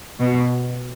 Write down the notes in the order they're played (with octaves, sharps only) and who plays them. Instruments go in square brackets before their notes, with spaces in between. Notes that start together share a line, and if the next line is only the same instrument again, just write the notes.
[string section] B2